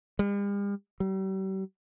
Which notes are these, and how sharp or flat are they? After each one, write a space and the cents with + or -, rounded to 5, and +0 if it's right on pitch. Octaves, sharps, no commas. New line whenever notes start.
G3 +45
G3 -40